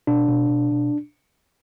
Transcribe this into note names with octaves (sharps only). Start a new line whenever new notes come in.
B2 D4
B2
B2
B2